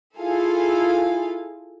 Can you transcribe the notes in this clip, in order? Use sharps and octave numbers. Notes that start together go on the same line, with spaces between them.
E4 F4 G#4 A4 F5 G#5